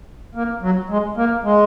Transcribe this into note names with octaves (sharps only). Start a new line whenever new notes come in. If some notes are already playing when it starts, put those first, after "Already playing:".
A#3
F#3
G#3
A#3
G#3